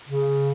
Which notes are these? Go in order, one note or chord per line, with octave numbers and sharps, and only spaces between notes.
C#3